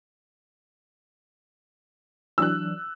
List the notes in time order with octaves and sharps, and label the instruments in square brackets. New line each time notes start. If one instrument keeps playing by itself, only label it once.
[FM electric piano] E3 F#3 D4 [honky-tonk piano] E6 F#6